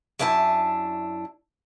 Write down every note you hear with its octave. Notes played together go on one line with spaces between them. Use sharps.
F#2 D4 E4 G#5 A5